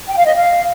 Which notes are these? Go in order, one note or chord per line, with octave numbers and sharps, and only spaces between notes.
G5
F5
D#5
F5